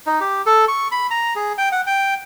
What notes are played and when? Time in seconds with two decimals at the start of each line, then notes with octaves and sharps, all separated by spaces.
0.06 D#4
0.21 G4
0.46 A4
0.68 C#6
0.92 B5
1.11 A#5
1.36 G#4
1.58 G5
1.72 F#5
1.87 G5